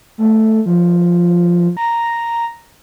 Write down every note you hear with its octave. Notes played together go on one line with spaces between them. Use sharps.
A3
F3
A#5